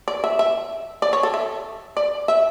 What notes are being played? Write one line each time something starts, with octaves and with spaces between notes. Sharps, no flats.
D5
E5
E5
D5
C#5
A4
E5
D5
E5